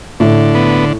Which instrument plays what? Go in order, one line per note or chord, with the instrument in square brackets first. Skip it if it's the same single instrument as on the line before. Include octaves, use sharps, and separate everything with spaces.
[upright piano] A2 [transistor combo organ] D3
[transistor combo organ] B3